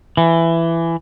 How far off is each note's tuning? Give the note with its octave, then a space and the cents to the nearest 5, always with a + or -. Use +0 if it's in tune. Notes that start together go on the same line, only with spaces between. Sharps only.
E3 +15